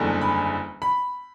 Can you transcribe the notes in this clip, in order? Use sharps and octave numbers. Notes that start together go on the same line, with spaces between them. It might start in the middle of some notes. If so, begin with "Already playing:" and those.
Already playing: F#1 E2 D3 G3
B5
B5